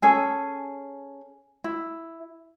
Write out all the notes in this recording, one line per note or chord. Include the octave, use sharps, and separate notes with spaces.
C#4 G#4 A4
E4